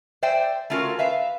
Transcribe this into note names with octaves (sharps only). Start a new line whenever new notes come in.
C5 D5 E5 G5
A3 C#4 F4 F#4 G#4 A#4
B4 E5 F5